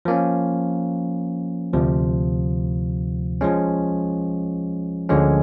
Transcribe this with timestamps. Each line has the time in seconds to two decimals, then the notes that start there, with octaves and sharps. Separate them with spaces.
0.05 F3 A#3 C#4
1.73 D2 C3 F3
3.41 F3 G#3 C#4
5.09 D2 D3 F3 G#3 C#4